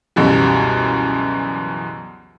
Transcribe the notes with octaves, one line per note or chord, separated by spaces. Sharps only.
C#2 F#2 B2 E3 G3